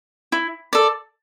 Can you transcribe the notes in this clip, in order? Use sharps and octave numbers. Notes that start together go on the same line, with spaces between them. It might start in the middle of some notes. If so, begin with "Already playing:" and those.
E4
A4 D5